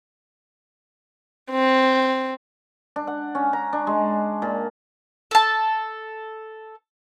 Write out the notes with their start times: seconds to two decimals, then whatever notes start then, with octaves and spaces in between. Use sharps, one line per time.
1.50 C4
2.96 D4
3.07 F#5
3.35 C#4
3.53 A#5
3.73 D4
3.87 G#3
4.42 A#2
5.31 A4 A5